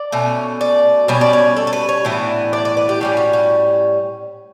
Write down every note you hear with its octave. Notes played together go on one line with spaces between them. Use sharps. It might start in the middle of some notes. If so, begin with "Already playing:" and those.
Already playing: D5
B2 A3 C#4
D5
B2 G3 C#4 C#5
D5
C#5
A4
A4
B4
C#5
A2 E3 B3 D4
D5
D5
B4
G4
A2 G3 C#4 F#4
F#4
F#4